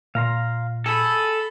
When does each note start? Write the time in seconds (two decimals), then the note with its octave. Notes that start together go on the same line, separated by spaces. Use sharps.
0.15 A#2 F5 A#5 C6
0.86 G#4 A4 B5